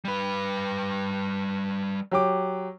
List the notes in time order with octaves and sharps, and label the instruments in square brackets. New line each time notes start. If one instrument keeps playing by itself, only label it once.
[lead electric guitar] G3 B4
[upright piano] F#3 G4 D6